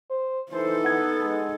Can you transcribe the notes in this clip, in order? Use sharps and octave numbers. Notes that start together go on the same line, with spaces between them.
C5
E3 D#4 A4 C5
B3 F#5 G#6
G#3